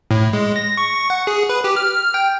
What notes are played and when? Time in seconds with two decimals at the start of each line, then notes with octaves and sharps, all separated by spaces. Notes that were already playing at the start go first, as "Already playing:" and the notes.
0.11 A2
0.33 G#3
0.56 A#6
0.77 C#6
1.10 F#5
1.27 G#4
1.49 B4
1.64 G4
1.76 F6
2.14 G5